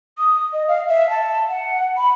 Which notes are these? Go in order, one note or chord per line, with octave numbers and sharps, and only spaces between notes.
D#6
D#5
F5
E5
A5
F#5
B5